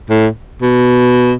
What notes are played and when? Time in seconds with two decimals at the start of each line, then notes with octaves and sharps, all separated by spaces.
0.10 A2
0.62 B2